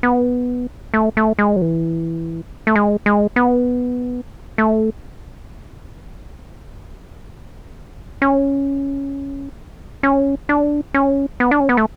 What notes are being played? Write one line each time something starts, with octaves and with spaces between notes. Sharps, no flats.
B3
A3
A3
G#3
F#3
E3
A3
G#3
G#3
B3
A3
C#4
C#4
D4
C#4
B3
D4
C#4
B3
A3